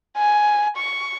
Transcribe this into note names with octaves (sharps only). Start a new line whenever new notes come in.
G#5
C#6